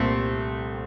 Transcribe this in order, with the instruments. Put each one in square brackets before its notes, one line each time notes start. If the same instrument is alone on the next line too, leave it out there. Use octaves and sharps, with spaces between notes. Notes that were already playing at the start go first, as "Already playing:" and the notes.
Already playing: [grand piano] C2 A#2 G3 A#3 [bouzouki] A3 C4